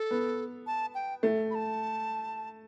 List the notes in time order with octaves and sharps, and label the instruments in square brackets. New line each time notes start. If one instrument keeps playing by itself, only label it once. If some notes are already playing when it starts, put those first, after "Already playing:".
Already playing: [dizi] A4
[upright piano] B3
[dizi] A5
G5
[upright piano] A3
[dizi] B5
A5